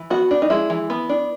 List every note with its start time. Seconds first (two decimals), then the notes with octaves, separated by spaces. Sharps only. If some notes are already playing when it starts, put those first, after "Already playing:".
Already playing: E3
0.10 B3 F#4
0.31 D4
0.42 D#4
0.50 G#3 E4
0.70 E3
0.90 B3
1.09 D4